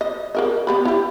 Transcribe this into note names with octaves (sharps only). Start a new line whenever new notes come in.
D#5
G#4 A#4 D#5
B3 G4 B5
E4 G4